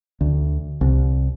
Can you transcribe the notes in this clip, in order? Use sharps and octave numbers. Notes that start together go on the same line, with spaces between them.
D2
C2